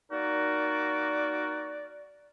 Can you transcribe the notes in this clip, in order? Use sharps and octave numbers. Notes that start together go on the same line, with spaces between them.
A#3 D#4 F#4 A#4 D5